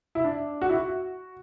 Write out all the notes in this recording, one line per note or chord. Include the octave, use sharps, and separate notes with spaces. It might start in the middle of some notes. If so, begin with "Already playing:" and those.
E4
D4
F#4
E4
F#4